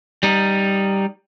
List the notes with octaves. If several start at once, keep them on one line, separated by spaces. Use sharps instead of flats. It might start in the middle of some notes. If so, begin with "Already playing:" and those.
G3 D#4